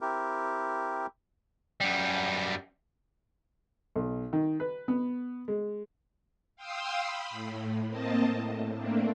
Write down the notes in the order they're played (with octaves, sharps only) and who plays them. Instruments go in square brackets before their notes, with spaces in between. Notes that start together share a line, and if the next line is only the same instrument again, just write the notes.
[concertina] C4 E4 G4 A#4
[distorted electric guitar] F#2 G3
[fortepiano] B1
D#3
B4
B3
G#3
[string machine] F5 G5 C6 D#6 E6
B5
A2
A#3 C4 D#5 A5
A2
A3 A#3 C4 D4